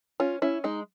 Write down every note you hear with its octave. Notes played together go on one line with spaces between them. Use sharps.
C#4 F4
C#4 E4
G#3 D#4